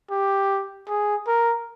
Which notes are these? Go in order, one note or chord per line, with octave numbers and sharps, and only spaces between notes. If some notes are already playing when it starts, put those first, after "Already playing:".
G4
G#4
A#4